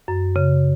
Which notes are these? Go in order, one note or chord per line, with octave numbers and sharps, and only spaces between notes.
F#2
C#3